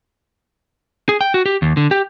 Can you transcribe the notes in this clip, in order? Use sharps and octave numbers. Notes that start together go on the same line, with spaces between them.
G#4
G5
F#4
G4
D#2
D3
G4